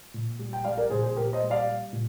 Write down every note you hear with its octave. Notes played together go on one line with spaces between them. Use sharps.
A#2
G3
G5
G3 D5 F5
A#4 D5
A#2 G#4 C5
G#4 C5
A#2 G4 A#4
C5 D#5
G3
D5 F5
G3
A#2